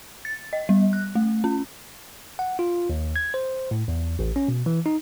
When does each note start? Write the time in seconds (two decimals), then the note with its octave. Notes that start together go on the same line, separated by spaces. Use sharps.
0.25 A6
0.53 D#5
0.69 G3
0.93 F#6
1.15 A3
1.44 C#4
2.39 F#5
2.59 F4
2.89 D#2
3.16 G#6
3.34 C5
3.71 A2
3.88 E2
4.19 A1
4.36 C#4
4.48 B2
4.66 E3
4.86 D#4